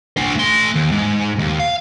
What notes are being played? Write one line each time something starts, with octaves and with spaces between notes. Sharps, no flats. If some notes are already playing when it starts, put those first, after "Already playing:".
D4 C5
A3 C6
D#2
G#2
D#2
F5